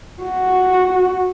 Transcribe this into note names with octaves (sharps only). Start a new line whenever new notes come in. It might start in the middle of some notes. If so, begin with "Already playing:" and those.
F#4